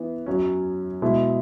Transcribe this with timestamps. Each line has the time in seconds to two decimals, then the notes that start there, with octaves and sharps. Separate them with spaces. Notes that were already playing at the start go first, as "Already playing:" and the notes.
Already playing: E3 B3
0.26 F#2 F#3 C#4
1.02 B2 G#3 E4